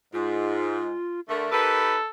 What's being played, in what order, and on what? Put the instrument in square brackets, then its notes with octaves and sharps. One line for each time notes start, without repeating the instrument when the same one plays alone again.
[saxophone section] G#2 [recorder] F4
[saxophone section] D3 A3 [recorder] A#4
[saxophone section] D#4 G4 B4 [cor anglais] A4